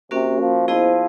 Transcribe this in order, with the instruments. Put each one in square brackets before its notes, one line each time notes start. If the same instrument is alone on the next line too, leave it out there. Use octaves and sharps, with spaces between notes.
[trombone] C3 [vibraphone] A#3 C#4 F#4 A#4
[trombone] F3
[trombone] F3 [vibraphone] B3 E4 G#4 C5 D#5